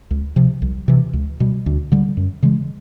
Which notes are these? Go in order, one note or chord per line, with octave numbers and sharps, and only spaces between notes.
C#2
C3 F3
C2
C3 E3
C#2
B2 G3
D2
D3 G3
F#2
C#3 E3 G#3